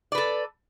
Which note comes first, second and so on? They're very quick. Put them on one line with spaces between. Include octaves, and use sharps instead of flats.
D5 B4 A4